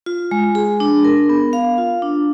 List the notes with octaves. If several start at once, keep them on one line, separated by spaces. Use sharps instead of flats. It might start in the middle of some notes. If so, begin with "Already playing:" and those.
F4
G#3
G#4
D4
A#4
B3
F5
F4
D4